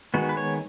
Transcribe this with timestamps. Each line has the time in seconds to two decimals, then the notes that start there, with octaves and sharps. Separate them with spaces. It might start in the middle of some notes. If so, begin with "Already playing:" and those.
0.14 D#3 G#3 B3 F#4
0.29 B4
0.37 C#5